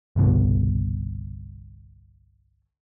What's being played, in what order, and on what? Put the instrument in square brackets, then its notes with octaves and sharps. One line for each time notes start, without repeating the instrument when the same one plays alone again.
[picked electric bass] G1 C2 B2 D3